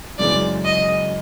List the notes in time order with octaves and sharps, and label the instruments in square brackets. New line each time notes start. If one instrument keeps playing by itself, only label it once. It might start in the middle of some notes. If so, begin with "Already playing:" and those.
[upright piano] F#2 C#3 E3 G#3 [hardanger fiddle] D5
[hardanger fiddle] D#5